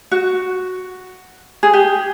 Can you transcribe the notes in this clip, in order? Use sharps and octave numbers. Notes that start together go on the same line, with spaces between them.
F#4
G#4
G4